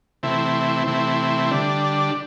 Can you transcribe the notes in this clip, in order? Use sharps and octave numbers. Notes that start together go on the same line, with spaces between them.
C3 E3 A3 C4 E4
C3 E3 A3 C4 E4
D3 G3 D4